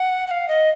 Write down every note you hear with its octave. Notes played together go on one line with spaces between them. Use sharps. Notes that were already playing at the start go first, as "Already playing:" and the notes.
Already playing: F#5
F#5
F5
D#5